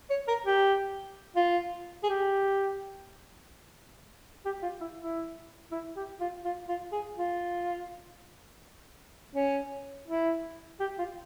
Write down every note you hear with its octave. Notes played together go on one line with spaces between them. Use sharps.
C#5
A#4
G4
F4
G#4
G4
G4
F4
E4
E4
E4
G4
F4
F4
F4
G#4
F4
C#4
E4
G4
F4